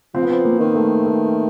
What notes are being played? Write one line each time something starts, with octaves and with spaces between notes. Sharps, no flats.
F3 C4
B3
C4
A#3
D#3
A3
A3